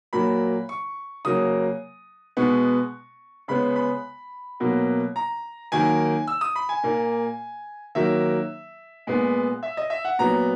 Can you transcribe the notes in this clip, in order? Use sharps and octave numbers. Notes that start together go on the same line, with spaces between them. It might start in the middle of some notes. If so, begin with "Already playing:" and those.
A#2 F#3 A#3 B5
C#6
C#3 F#3 A#3 D#6
B2 G#3 B3 C#6
C#3 G#3 B3 B5
B5
B2 F#3 A#3
A#5
D#3 F#3 A#3 G#5
E6
D#6
B5
G#5
A#2 A#3
D#3 F#3 A#3 E5
A#2 G#3 B3
E5
D#5
E5
F#5
A#2 F#3 B3 A#5